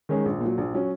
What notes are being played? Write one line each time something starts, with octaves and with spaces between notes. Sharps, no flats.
D#3 G#3 C#4 G#4
A#1
A#2 F#3
A#1
F#3 C#4